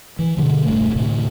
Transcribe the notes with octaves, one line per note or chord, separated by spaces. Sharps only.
E3
G2 B2 D3 F3
E1 G2 A3
D2 A2 C3